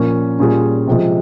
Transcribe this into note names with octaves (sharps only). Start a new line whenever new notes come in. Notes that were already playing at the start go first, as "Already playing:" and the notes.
Already playing: A#2 F3 A#3 C#4
A#2 G3 C#4 F4 G#4
C3 F3 G#3